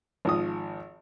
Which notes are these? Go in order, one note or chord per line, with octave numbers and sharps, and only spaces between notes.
G#1 F3 D#6